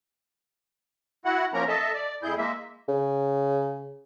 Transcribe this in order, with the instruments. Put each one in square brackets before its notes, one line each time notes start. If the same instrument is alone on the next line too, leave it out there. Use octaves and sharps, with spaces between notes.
[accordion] E4 F#4 F#5
F3 A#3 C#4 A#4 A#5
A4 D#5 E5 A5
D5
F2 E4 G#4 G6
G#3 A#3 E5
[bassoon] C#3